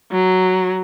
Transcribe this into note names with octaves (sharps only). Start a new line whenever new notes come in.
F#3